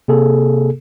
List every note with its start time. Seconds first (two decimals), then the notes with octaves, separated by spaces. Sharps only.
0.08 C3 A#3 G#4 A4